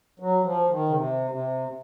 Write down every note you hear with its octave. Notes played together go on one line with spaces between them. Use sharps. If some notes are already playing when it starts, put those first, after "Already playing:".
F#3
F3
D#3
C#3
C3
C3